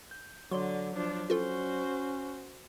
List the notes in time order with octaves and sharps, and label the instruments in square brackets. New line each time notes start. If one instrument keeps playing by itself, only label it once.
[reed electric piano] G6
[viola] D3 [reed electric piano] F#3 C#5 D5 [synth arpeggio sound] C6
[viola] F3 D4
[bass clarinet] C#4 [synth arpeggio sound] F4 A4 [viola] F#4 C5